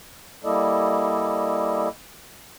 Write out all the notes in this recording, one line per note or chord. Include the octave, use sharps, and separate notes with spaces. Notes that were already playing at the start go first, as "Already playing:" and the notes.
G3 A#3 E4 A4 D5 D#5